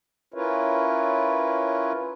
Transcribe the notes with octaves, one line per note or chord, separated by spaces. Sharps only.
C#4 E4 F4 A#4 B4 C#5